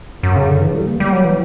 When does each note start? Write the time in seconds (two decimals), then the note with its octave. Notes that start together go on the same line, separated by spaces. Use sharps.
0.23 F#2
0.36 C#3
0.50 D3
0.61 E3
0.74 G3
0.87 A#3
1.00 G3
1.12 F#3
1.24 E3